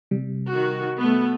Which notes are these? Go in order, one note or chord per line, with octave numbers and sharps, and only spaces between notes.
C3 G3
D#3 F#4
A3 B3